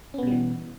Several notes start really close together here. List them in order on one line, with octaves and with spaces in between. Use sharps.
C#4 B3 B2 G3 E3